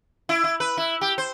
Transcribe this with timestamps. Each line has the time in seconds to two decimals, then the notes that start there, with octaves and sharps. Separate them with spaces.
0.29 E4
0.44 E4
0.60 B4
0.77 E4
1.01 G4
1.18 C5